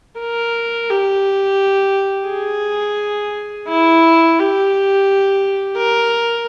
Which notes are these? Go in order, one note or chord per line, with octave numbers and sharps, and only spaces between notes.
A#4
G4
G#4
E4
G4
A#4